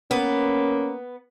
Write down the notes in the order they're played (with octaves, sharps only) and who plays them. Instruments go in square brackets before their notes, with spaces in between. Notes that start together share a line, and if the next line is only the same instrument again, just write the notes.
[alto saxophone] A#3 [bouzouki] B3 [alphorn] C#4